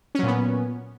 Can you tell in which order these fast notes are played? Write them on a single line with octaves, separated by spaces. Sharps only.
C#4 F#3 A#2 B3